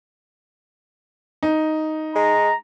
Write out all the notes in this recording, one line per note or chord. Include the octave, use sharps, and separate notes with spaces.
D#4
G#3 A#5